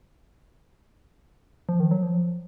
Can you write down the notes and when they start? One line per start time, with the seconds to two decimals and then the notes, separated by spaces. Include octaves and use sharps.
1.69 F3
1.80 D#3
1.91 F#3
2.02 F3